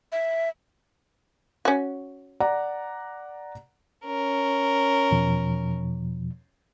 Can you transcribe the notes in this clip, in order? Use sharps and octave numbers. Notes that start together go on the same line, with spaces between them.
E5
C#4 F#4
D5 F#5 A#5
C#4 A#4
E2 B2 F3